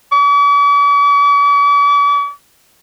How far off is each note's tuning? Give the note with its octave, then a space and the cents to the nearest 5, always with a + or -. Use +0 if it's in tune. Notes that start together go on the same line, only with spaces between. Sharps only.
D6 -45